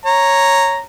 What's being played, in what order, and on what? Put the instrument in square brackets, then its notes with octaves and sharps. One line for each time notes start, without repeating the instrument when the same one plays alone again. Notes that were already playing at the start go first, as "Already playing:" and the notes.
[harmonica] C#5 A#5